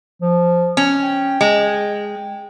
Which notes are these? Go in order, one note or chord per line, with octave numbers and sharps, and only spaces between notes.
F3
C#4
G5
G#3